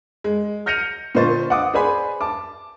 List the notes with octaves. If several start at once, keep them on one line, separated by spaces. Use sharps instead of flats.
G#3
F6 G6 A#6 C#7 D#7 F7
A#2 D3 B4 C5 C#6 A6
F#5 D6 D#6
G#4 B4 C5 D5 G#5 B5
A5 D6